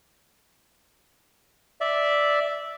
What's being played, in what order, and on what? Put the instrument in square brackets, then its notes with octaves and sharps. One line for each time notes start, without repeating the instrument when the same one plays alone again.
[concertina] D5 E5